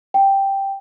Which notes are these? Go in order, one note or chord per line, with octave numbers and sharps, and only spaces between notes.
G5